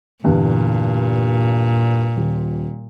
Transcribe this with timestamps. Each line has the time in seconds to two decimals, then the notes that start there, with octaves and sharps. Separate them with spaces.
0.24 E2 G2 A#2 D3
2.16 D#1